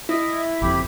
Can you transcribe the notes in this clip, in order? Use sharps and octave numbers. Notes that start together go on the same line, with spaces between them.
E4 D#5
F#1 F2 G4 B5